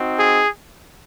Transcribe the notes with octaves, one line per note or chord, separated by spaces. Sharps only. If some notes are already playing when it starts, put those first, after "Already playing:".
Already playing: C4 D#4 F#4
G#4